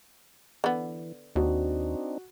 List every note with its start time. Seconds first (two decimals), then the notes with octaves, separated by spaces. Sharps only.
0.64 D3 E3 B3
1.35 D#2 C4 D4 D#4 F#4